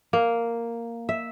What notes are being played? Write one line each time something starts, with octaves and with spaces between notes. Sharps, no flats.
A#3
E5